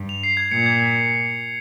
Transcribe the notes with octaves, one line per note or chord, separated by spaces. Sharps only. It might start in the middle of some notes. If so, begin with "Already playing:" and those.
Already playing: G2
F7
C7
G#6
A#2 C#7
G#6